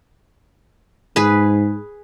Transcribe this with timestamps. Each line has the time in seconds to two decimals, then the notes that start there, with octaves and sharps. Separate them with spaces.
1.16 G#2 G#4 B4